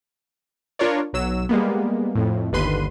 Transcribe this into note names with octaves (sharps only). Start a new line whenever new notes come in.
D4 F4 A#4 C#5 D5
B1 F#3 E6 E7
G3 G#3 A#3 B3
F2 A2
G1 D#2 D3 B4 C6 D#7